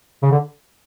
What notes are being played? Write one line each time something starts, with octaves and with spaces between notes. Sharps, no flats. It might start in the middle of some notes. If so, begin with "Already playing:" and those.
C#3
D3